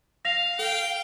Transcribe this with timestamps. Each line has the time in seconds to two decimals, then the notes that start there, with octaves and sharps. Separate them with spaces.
0.25 F5 A#6 F7
0.59 A4 G5